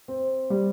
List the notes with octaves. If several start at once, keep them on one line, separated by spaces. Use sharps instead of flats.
C4
G3